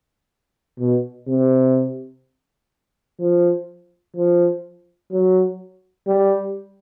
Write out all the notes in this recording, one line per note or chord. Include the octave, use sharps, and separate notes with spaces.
B2
C3
F3
F3
F#3
G3